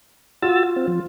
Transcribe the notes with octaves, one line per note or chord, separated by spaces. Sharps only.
F4 F#4 E6 A6
C4
F3